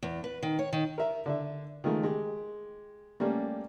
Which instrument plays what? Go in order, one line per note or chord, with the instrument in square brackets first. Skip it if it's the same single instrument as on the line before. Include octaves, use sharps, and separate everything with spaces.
[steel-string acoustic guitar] E2
B4
D#3
C#5
D#3
[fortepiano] A#4 E5
D3 E5
D#3 F3 G#3 A3
G#3 G4
G3 A3 A#3 C#4